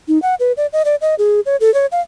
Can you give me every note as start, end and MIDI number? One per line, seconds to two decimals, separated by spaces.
0.08 0.21 63
0.22 0.35 78
0.40 0.52 71
0.57 0.67 74
0.73 0.83 75
0.85 0.96 74
1.01 1.15 75
1.19 1.40 68
1.46 1.56 73
1.60 1.73 69
1.74 1.86 73
1.92 2.00 77